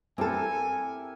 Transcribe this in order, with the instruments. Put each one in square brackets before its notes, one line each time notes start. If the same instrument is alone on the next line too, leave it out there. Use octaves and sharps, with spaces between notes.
[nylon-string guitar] C4 A4 [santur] E4 G4 A#4 [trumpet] G#5